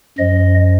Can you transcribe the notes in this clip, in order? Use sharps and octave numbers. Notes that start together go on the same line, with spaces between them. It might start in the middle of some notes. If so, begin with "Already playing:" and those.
F#2 F3 D#5